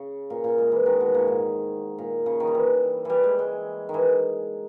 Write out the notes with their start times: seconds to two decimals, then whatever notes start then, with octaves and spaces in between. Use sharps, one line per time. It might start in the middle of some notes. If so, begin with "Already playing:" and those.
Already playing: C#3
0.30 A#2
0.44 A#2
0.58 G#3
0.72 E3
0.86 D#3
1.00 B2
1.14 A#2
1.28 G#2
1.98 A#2
2.26 C#3
2.40 D#3
2.47 G3
2.55 E3
3.05 E3 G3
3.24 G#3
3.39 G#3
3.89 D#3
3.94 E3